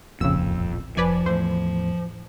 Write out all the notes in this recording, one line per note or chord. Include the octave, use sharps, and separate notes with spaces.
D#1 A1 F2 A#2 C#3 E6
F1 F3 B4 D5 G#5
E2 A2 C5